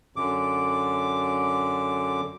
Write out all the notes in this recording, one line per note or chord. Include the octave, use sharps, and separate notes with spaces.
F#2 D3 D6